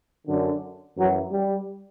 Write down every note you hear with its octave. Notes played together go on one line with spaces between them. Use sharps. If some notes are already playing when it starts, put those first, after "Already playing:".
F#2 D3
F#2 E3 F#3
G3